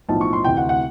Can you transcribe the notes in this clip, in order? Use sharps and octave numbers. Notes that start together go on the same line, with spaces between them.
B1 A2 F3 A5
C#6
C6
D2 C3 E3 G5
F#5
F#5